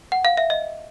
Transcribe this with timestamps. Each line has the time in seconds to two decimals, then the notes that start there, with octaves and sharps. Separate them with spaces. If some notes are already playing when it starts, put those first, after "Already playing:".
0.12 F#5
0.25 F5
0.37 E5
0.50 D#5